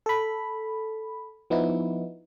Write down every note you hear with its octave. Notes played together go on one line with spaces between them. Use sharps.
A4 B5
F3 B3 D#4 E4